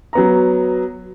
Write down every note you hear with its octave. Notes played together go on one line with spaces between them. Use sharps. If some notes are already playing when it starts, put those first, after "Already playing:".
F#3 B3 A#5